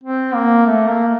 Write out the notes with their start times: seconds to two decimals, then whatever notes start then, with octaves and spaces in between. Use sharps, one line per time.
0.04 C4
0.35 A#3
0.67 A3
0.88 A#3